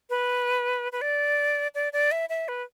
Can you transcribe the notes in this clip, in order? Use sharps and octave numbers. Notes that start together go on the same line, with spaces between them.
B4
B4
D5
D5
D5
E5
E5
B4